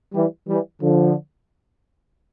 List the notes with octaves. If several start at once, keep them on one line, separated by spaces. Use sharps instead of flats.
E3 G3
E3 G3
D3 F3